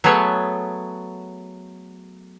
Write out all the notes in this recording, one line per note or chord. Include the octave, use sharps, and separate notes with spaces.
F#3 A3 B3 G#4 C#5